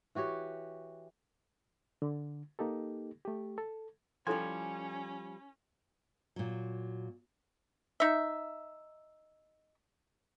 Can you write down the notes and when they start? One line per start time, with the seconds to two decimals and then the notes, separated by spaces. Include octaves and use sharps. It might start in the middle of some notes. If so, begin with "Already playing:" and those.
0.15 E3 F#4 G4 C#5
2.02 D3
2.59 A#3 D#4 G4 A4
3.25 A3 G4
3.58 A4
4.27 F3 G3 C#4 E4 A4 G#5 C6
6.36 A#2 F#3
8.00 D#4 E5